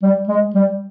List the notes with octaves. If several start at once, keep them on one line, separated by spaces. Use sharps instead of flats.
G3
G#3
G3